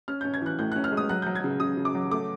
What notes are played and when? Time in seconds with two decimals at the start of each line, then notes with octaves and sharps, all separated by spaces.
0.08 C#4 F6
0.21 G6
0.25 C#4
0.34 G#6
0.41 E3 F#6
0.59 A2 G6
0.72 F#6
0.76 C#4
0.84 F6
0.92 G#3
0.97 D#6
1.09 F#3 F#6
1.22 G6
1.26 F#3
1.35 G#6
1.44 C#3
1.60 C#3 D#6
1.77 C#3
1.85 D6
1.95 F#3
2.11 A3 D6